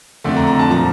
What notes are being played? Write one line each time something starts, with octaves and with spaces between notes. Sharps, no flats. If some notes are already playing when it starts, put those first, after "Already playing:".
F2 D3 A3 D4
A#5
A#5
A5
A#2 F3 A#5